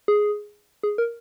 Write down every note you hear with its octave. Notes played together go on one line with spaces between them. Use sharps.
G#4
G#4
A#4